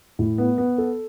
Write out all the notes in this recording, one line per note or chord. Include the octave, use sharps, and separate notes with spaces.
A2
B3
B3
A4